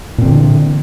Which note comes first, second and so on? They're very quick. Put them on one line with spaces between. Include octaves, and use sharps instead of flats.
A#2 C4 D3 E3